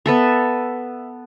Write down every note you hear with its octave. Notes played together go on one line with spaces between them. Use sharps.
B3 A4 E5